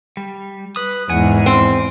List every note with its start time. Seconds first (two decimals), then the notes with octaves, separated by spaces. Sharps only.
0.17 G3
0.76 B4 D#6
1.10 E2 G#2 F#5 G#5
1.46 C4